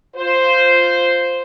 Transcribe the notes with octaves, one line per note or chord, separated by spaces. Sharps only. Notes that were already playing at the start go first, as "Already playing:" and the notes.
F4 C5